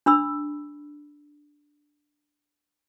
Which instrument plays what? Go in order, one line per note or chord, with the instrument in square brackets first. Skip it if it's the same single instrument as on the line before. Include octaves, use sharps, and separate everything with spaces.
[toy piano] D4 B5 E6